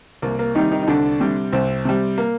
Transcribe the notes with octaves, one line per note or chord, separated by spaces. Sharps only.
C2 A#3
A#3
C3 D#3 G3 D#4
D#3 D#4
D#4
C2 D3 D4
C3 G3
C2 C4
C3 G3
A#3